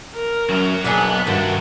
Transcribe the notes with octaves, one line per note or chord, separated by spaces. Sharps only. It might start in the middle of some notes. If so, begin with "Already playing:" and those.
A#4
F#2 F#4 A#5
B1 A#3 B3 D4 G#4 F#6
G2 D#3 F#4 A4 A#4